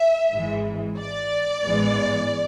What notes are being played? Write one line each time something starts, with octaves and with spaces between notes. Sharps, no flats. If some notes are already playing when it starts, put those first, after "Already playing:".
Already playing: E5
G#1 G#2 E3 G#3
D5
A1 G#2 E3 G#3 B3